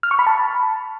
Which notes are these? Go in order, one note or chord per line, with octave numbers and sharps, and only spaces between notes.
F6
C#6
B5
A5